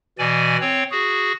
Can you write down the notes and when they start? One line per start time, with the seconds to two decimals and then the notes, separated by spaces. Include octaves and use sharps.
0.18 B2 E3 D5 G#5
0.61 C4 C#5
0.91 F#4 G#4